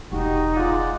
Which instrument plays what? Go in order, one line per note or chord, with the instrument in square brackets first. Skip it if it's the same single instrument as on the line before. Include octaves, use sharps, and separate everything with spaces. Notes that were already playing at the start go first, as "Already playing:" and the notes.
[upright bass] E1 [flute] D#4 [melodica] F#4 [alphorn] G4
[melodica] G#3 D5 F#5 [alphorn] F4